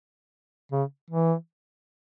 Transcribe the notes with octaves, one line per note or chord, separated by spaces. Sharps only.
C#3
E3